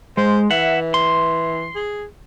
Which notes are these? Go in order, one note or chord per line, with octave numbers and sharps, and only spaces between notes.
G#3 C5
E3 E5 F#5
C6
G#4